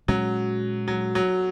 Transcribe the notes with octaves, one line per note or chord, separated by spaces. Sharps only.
A#2 F#3 G#3 C#4
F#3
F#3